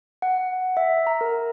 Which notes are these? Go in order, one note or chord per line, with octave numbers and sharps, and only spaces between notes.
F#5
E5
A#5
A#4